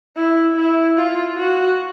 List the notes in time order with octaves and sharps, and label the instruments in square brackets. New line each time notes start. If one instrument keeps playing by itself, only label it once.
[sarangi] E4
E4
F4
F#4